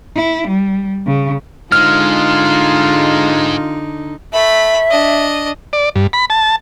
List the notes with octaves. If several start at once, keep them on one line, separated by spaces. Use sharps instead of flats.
E4
G3
C#3
G#2 D3 G#3 D#4 F4 F6
A3 E5 B5
D4 D#5
D5
G2
B5
A5